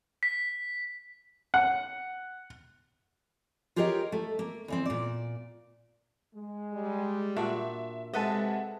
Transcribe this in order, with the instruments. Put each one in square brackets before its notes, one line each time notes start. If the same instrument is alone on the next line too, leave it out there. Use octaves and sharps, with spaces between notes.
[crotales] B6
[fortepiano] F#5
[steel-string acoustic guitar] F4 G4 G#4 A#4 C#5 D#5
A3
A#3
E2 E3 C4
A#2 D5
[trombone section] G#3
[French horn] G3
[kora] A#2 D4 F#4 [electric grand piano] E5
[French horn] C3 [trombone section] G#3 [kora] A4 B4 D#5 [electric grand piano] E5 F#5 A5